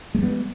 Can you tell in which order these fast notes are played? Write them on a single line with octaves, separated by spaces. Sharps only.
G#3 G3 B3